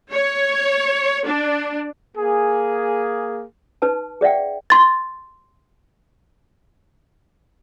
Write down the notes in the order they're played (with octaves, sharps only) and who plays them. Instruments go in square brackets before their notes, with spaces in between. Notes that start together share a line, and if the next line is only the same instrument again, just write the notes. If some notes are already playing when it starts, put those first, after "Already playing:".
[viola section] C#5
D4
[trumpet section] A#3 G#4
[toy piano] D#4 B4 A5
G#4 D5 E5 F#5 G5
[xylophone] C6 A6